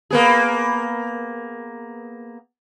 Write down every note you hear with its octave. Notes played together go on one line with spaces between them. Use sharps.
A#3 B3 G#4